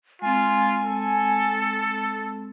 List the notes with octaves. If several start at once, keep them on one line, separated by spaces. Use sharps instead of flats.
G#3 C4 F4 G#5
A4